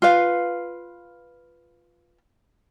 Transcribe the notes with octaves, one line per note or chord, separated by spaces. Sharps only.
F4 B4 F5